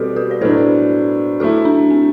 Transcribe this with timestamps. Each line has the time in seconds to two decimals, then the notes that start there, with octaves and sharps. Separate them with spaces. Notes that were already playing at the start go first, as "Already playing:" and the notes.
Already playing: B2 G3 C4 F#4 G4 A4 B4
0.16 G4 B4
0.31 D5
0.41 A2 F#3 B3 D4 A4 C5
1.40 F#3 A3 E4 F#4 A4
1.65 D4
1.91 C4